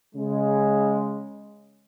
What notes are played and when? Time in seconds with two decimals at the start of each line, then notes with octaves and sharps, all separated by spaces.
0.15 C#3 G#3